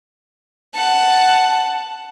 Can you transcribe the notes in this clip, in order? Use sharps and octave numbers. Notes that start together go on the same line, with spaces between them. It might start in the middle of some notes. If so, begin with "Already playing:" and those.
F#5 A5